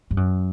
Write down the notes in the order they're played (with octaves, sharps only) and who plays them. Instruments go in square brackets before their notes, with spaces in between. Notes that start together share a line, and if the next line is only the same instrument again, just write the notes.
[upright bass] G2
F#2